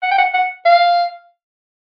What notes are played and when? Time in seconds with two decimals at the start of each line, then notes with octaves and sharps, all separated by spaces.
0.03 F#5
0.11 G5
0.18 F#5
0.34 F#5
0.65 F5